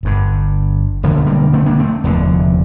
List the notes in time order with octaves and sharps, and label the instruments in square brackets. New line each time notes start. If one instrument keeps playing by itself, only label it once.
[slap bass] G1 G2 D3
E1 D2 D3 A#3
A3
G3 A#3
A3 C4
A#3 D4
A3 C4
F1 E2 D3